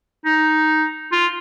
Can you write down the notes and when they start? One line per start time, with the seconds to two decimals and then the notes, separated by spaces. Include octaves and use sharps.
0.25 D#4
1.12 F4